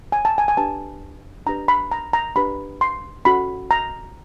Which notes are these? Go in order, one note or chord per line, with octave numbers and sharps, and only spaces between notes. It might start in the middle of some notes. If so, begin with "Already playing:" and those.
G#5
A5
G#5
G#5
D4 G4 B4 A5
D4 G4 B4 A#5
B5
A#5
A#5
D4 G4 B4 B5
C6
C#4 F#4 A4 B5
A#5